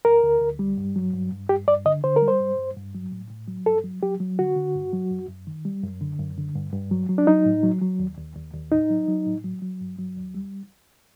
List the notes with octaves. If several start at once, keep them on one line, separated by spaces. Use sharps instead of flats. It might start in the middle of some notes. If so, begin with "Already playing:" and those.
D2 A#4
D2
D2
G3
G2
F#3
G2
G2
G2 G4
G2 D5
D3 D#5
D3 C5
A#4
G3
C5
G2
G2
G2
F#3
A2
A2
F#3
G2 A4
F#3
F#3 G4
F#3
D3 F#4
D3
G2
F#3
F#2
F#2
D#3
G3
F#2
D3
F#2
D3
G2
G2
F#3
F#3
D4
F#3 D#4
A2
F#3
F#3
D#2
D#2
D#2
D#2
A2 D#4
F#3
F#3
A2
F#3
F#3
G2
F#3
D#2
G3